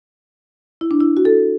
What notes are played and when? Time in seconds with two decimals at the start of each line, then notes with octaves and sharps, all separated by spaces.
0.81 E4
0.91 D4
1.01 E4
1.17 F#4
1.25 A4